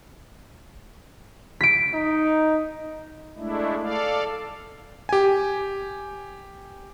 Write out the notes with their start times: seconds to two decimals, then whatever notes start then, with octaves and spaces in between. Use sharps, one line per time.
1.61 B6 D7
1.94 D#4
3.37 G#3 A3 D4 E4
3.82 A4 D5 F5
5.09 G4 G#5